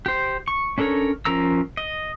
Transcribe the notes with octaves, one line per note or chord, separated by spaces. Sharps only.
G4 C5
C#6
C#4 D4 A4 A#4 C#5
F3 C#4 A#4 A#5 E6
D#5